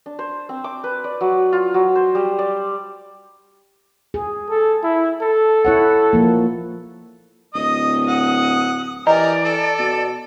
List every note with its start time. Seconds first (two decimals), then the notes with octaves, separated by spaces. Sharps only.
0.06 D4
0.19 C5
0.49 C4
0.64 D6
0.84 B4
1.04 D5
1.21 F#3
1.53 F4
1.74 F#3
1.96 C5
2.15 G3
2.39 D5
4.14 G#4
4.50 A4
4.83 E4
5.22 A4
5.65 E4 C#5 F#5
6.13 F3 A#3
7.55 D1 D#5 D#6
8.08 F#5
9.07 E3 G4 G#4 A#4 D5 D#5 A#5
9.45 A4 A5
9.79 B2